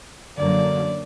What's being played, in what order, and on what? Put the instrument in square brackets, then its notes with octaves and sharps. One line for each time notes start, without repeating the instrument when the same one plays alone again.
[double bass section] F#2 D3 F#3 A#3 [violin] D5